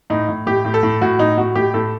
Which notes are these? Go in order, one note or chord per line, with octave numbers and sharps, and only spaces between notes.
A2 D#4
A2
A2 G4
A2
A4
A2
A2 F#4
A2 D#4
A2 F#4
A2 G4
A2 A4